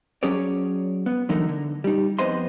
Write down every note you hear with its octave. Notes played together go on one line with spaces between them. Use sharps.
F#3 C#4 G#4 C#5 D5
B3
D3 E3 F#3 A3 D#4 A#4
D3
G3 D#4
F2 B3 C5 D#5 C6